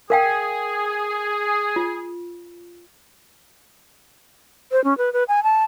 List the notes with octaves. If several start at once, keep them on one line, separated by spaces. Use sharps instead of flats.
G#4 A#4 F5 G5
F4
C5
C#4
B4
B4
G#5
A5